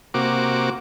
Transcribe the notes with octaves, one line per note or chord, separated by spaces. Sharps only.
C3 A#3 F#4 D6